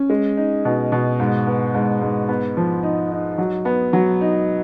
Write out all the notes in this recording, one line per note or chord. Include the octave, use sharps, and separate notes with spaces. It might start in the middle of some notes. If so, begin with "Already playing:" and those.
Already playing: C#4
G#3
D#4
B2
B2
G#2
B3
G#2
G#2
B3
F3
D#4
D#4
F#3
B3
F#3
D#4